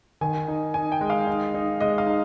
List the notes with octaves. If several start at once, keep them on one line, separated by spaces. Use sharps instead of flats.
D#3 G#5
D#4
D#4 G#5
G5
G#3
F5
D#4
D#4
G#3 D#5
F5
D#4